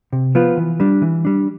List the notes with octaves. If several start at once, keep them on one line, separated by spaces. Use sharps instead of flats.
C3
F3 B3 F4 B4
E3
G3 D4
E3
G3 D4